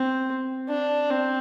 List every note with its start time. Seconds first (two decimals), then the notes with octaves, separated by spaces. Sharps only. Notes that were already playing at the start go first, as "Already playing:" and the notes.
Already playing: C4
0.70 D4
1.10 C4